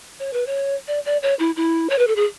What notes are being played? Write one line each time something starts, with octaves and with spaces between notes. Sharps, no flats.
C#5
B4
C#5
D5
D5
C#5
E4
E4
C#5
B4
A4
G#4